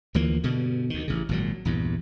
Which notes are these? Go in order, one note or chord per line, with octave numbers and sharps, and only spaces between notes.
D2 E3 F3 A#3
G2 B2 D3
D2 D#3
A1 C#3
G#1 A#2 F#3
A#1 E2 G2